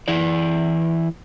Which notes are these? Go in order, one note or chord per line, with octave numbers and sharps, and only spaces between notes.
E3 E4 D5